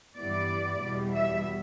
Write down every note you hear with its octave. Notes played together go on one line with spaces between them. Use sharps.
G2 E3 G3 B3 D5
E2 B2 G3 B3
E5